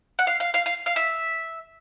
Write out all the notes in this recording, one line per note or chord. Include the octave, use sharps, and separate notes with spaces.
F#5
F5
F5
F5
F5
F5
E5